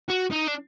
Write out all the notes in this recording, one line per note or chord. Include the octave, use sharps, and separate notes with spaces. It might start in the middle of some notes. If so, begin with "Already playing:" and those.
F#4
D#4
D4